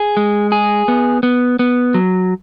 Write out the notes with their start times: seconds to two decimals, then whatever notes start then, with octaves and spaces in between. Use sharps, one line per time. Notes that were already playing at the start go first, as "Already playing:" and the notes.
Already playing: G#4
0.17 G#3
0.52 G#4
0.88 B3
1.23 B3
1.59 B3
1.94 F#3